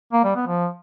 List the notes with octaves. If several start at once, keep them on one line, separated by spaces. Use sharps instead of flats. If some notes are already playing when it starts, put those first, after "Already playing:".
A#3
G3
B3
F3